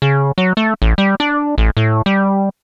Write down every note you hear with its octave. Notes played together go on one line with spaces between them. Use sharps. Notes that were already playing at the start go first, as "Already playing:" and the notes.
C#3
F#3
A3
A1
G3
D4
A1
A2
G3